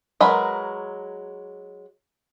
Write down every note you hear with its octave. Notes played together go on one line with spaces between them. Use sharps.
F#3 G#3 A#4 B4 B5